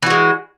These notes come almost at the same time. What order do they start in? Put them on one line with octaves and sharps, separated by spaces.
E3 F#4 G#3